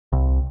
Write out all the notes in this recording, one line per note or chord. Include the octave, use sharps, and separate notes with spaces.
C2